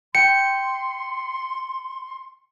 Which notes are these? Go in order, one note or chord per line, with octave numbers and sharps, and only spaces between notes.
G5 C6 C#7